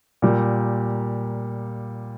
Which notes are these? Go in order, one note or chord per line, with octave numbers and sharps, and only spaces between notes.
A#2 G3 A#3